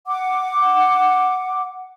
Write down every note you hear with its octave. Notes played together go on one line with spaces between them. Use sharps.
F#5 D6